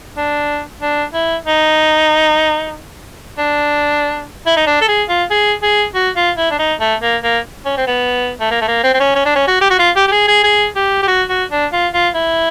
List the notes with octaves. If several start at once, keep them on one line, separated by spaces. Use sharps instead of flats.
D4
D4
E4
D#4
D4
E4
D#4
D4
A4
G#4
F4
G#4
G#4
F#4
F4
E4
D4
D#4
A3
A#3
A#3
C#4
C4
B3
A3
A#3
A3
A#3
C4
C4
C#4
C#4
D4
C#4
F#4
G4
F#4
F4
G4
G4
G#4
G#4
G#4
G4
G4
F#4
F#4
D4
F4
F4
E4